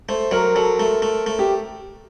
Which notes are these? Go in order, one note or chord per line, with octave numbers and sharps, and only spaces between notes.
A3 C5
F#3 A#4
F#3 A4
A3
A3
A3
G4